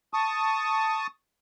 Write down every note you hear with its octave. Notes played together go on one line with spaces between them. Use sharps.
A5 C#6 D#6